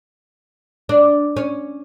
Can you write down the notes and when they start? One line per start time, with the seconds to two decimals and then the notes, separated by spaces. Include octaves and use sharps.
0.89 D4
1.36 C#4